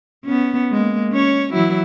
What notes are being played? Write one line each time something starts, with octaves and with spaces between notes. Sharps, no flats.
B3 C#4
G#3 A#3
C#4 C#5
E3 F#3 E4